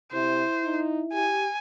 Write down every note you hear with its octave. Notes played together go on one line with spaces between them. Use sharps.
C3 E4 C5 E5
D#4
G4 G#5